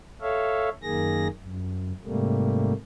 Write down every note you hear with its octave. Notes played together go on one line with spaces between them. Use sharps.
A4 C#5 E5 F5
F#2 D#3 A#3 G#4 A#6
F#2
G#2 C3 G3 A3 A#3